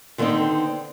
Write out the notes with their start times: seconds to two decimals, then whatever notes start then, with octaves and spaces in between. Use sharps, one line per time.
0.18 D3 D#3 A3 B3 C4 D#4